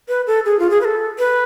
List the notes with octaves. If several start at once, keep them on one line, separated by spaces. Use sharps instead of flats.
B4
A4
G#4
F4
G#4
B4
A4
B4